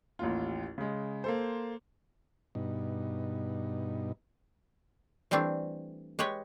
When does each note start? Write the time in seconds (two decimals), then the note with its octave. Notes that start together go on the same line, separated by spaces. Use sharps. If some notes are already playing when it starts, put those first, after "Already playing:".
0.19 A1 D#2 F4
0.78 C#3 G#3
1.24 A#3 A4 C5
2.55 G2 B2 D#4
5.31 E3 G3 A3 C4 D4
6.19 G#3 G4 B4 C#5